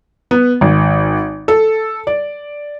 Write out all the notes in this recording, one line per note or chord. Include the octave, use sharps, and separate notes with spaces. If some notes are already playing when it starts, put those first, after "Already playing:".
B3
G#1
A4
D5